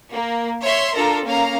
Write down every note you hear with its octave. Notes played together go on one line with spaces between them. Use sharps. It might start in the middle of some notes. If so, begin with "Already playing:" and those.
A#3
C#5 E5 C6
D4 F4 A4 A#4 A#5
A#3 C#4 F5 A#5